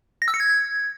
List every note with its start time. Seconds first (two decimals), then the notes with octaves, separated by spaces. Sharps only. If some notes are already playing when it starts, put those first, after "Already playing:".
0.22 A#6
0.28 E6
0.34 C#7
0.40 G#6